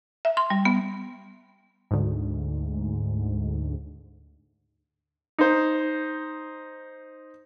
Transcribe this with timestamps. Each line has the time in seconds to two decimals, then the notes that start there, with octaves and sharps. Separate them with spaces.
0.25 E5
0.37 C6
0.50 G3
0.65 B3
1.91 D2 G#2
5.38 D#4 C5